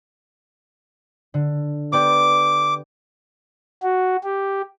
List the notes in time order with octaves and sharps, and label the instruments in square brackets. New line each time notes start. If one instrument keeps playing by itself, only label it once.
[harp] D3
[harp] B3 G4 D5 [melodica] D6
[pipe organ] F#4
G4